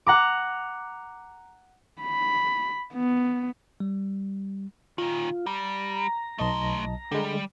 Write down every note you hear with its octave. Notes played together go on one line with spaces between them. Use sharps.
F#5 A#5 D6
B5
B3
G3
A#2 D#3 F4
G3 A#5
B1 A3 D#5 A5 C6
D3 G3 G#3